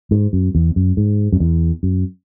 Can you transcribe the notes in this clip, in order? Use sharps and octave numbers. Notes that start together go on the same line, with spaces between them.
G#2
F#2
E2
F#2
G#2
F#2
E2
F#2